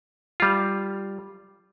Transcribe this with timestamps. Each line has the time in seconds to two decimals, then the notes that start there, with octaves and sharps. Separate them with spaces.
0.40 G3 F4